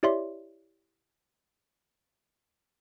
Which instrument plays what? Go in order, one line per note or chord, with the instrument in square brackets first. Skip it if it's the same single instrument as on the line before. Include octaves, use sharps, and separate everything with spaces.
[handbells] E4 G4 C#5 D5 E5 C6